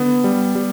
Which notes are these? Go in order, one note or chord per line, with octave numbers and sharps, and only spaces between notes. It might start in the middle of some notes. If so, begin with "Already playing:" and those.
Already playing: D3 B3
G3
G3